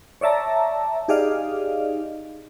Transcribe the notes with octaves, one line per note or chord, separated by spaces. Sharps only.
C#5 D5 E5 A5 A#5
D#4 G4 G#4 D5 D#5 F5